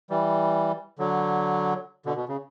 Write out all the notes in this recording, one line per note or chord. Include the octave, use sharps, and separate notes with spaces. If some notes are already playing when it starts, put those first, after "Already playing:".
E3 G3
D3 F#3
B2 D3
B2
C#3